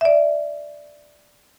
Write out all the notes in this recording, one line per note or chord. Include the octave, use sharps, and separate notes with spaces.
D5 E5